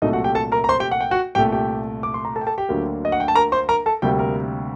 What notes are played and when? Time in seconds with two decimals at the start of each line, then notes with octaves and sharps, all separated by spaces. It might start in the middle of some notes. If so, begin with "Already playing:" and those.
0.02 C2 A#2 F#3 A3 D#4 D#5
0.13 F#4 F#5
0.24 G4 G5
0.35 A4 A5
0.52 A#4 A#5
0.64 A#5
0.69 C5 C6
0.80 G4 G5
0.91 F#5
1.01 G5
1.11 F#4 F#5
1.35 C2 A#2 A3 G4 G5
1.52 G4 G5
2.03 D6
2.14 C6
2.25 A#5
2.36 A4 A5
2.41 G5
2.47 A4 A5
2.58 G4 G5
2.69 D2 D3 F#3 A#3
3.05 D#5
3.12 F#5
3.20 G5
3.28 A5
3.35 A#4 A#5
3.52 C5 C6
3.69 A#4 A#5
3.86 A4 A5
4.02 D2 C3 G3 A#3 G4 G5
4.19 A#4